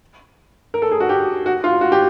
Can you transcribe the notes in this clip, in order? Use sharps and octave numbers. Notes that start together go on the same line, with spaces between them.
A#4
A4
G#4
F#4
G4
F#4
F4
F#4
G4